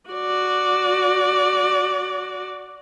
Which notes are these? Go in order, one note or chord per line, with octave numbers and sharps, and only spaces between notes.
F#4 D5